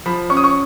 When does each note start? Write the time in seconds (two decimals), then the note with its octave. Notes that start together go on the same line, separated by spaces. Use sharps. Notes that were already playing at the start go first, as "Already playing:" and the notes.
0.06 F3 B5
0.30 C#4 C#6
0.37 D#6
0.44 C#6